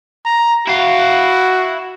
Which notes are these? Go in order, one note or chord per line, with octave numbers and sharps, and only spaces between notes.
A#5
E4 F#4 F5